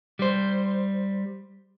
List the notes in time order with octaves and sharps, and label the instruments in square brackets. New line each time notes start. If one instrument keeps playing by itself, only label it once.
[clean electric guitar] G3 C5